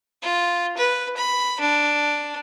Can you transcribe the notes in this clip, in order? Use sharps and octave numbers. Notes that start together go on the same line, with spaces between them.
F4
B4
B5
D4